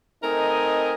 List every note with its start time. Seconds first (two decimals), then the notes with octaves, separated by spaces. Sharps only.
0.23 A3 C4 D#4 A#4 D#5 G#5